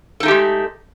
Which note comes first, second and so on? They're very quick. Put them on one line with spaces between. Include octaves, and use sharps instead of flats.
A4 D#4 A3 G4 G#3